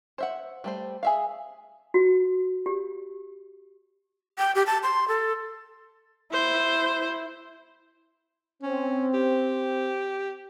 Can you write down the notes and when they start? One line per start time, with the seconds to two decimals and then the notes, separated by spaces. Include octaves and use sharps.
0.18 C5 E5 F#5
0.64 G3 A3 C5
1.03 G#4 E5 F5
1.94 F#4
2.66 G4
4.38 G5
4.55 G4
4.66 A5
4.83 C6
5.08 A4
6.32 E4 C5
8.63 C4 C#4
9.14 G4